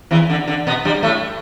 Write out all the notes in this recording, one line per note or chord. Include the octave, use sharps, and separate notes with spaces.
E2 E3
D3
D3
B2 B3
G2 G3
A2 A3